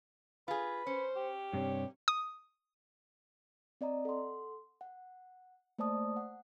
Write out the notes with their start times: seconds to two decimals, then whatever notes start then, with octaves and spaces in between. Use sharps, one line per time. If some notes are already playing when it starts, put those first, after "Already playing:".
0.48 F4 G#4 B4
0.87 C#4 C5
1.16 G4
1.53 G2 C3 C#5
2.08 D#6
3.81 C4 D5 D#5 A#5
4.05 A4 F#5 C6
4.81 F#5
5.78 A3 A#3 C5 D5 A5 D#6
6.16 F#5